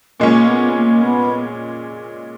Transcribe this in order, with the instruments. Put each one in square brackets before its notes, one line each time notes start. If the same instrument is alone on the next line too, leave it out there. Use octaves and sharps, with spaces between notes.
[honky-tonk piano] A#2 G#3 C#4 [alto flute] A#3
[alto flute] B3
A#3
B3